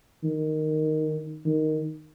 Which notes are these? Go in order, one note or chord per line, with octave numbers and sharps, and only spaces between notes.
D#3
D#3